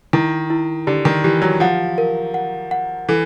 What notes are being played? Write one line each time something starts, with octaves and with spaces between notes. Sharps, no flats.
D#3 E4
E4
D3 G4
D#3
E3 G4
F#3
F3 F#5
A#4
F#5
F#5
E3 A4